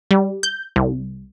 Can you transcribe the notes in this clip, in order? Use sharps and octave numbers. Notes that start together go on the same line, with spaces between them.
G3
G6
C2